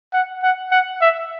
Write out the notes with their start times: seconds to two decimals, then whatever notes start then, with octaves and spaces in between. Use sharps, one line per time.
0.13 F#5
0.43 F#5
0.71 F#5
1.01 E5